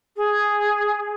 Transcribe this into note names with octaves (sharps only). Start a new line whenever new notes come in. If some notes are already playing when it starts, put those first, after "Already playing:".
G#4